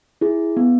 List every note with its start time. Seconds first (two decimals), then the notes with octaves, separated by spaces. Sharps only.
0.21 E4 G#4
0.57 B3